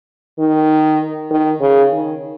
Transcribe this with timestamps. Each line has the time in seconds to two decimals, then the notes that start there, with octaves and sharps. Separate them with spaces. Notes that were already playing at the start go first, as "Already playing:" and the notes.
0.39 D#3
1.31 D#3
1.61 C#3
1.92 D#3